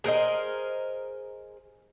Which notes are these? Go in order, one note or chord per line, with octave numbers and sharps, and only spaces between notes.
G#4 A#4 C5 D#5